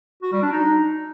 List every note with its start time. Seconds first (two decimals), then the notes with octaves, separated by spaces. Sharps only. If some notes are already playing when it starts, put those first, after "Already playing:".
0.22 F#4
0.33 G3
0.43 D4
0.53 D#4